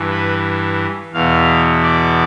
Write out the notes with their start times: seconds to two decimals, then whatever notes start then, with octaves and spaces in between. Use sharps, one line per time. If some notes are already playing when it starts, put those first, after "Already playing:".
Already playing: G2 E3
0.11 B4
1.14 E2 B2 F5
1.82 D5